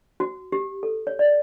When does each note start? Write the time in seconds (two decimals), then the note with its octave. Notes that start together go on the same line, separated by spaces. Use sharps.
0.20 F#4
0.52 G4
0.83 A4
1.07 C#5
1.19 D5